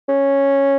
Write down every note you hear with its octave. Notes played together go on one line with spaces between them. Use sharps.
C#4